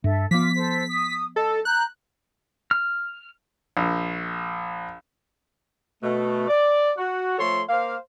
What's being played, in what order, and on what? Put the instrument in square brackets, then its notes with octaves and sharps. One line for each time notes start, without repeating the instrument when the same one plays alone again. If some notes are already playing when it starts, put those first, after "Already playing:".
[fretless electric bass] G2 [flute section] A4 E5
[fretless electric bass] F3 B3 [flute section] F4 D6 [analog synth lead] B6
[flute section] A4 C5
D#6
[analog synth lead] A4 [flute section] D#5
[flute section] A#5 G6 [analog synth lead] F#6
[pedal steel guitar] F6
[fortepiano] A#1
[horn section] B2 A3
D5
F#4
F3 A3 A4 C#5 C6
A#3 C5 F5